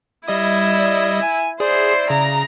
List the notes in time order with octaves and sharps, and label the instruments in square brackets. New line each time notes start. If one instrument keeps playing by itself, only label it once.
[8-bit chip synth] G3 D#5 D#6 [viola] E4
[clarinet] D5
G#5
[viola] E4 C5 [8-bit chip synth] G#4 [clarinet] D5
[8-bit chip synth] C#3 [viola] A#5